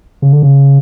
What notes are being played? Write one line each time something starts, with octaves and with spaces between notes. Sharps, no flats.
C#3
D3
C#3